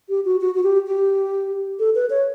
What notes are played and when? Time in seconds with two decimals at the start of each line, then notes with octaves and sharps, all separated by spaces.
0.09 G4
0.25 F#4
0.41 F#4
0.55 F#4
0.63 G4
0.87 G4
1.79 A4
1.95 B4
2.10 C#5